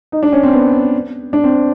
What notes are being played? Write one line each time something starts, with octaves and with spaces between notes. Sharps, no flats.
D#4
D4
C#4
C4
B3
D4
C4